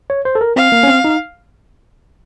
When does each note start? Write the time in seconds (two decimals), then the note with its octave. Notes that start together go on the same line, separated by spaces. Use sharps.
0.10 C#5
0.25 C5
0.35 A4
0.41 A#4
0.56 C4 F5
0.72 A#3
0.83 C#4
0.88 C4
1.04 D#4